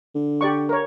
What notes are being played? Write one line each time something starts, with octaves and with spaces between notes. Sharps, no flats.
D3
G4 D5 C#6
A#4 C#5